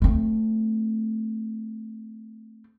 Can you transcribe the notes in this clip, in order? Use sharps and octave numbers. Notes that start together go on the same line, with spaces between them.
A3 C4